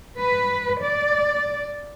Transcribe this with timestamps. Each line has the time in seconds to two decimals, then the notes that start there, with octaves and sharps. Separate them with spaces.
0.19 B4
0.84 D5